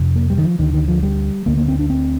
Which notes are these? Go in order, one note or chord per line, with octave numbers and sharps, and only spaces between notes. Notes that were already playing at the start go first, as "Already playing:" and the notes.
Already playing: F2 C3
A#3
G3
D#3
F3
D2 D3 D#3
D#3
F3
G3
D2 D3 A#3
A#3
C4
D4
C4